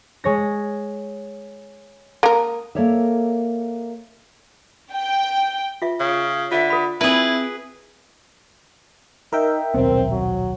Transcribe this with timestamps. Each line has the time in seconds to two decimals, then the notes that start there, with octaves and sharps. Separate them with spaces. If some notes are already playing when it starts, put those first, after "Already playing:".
0.24 G#3 C#5 A#6
2.23 A#3 A#4 D#6
2.75 A#3 A4 A#4 C#5 D5 E5
4.93 G5
5.82 F4 E5
6.00 C#3
6.51 D3 F4 E5
6.70 A4 B5
7.01 C4 E4 G#4 B4
9.33 D#4 A#4 E5 G5
9.74 D#1 B1 B3 C4
10.11 F#3